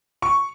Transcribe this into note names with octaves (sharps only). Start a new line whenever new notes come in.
C#6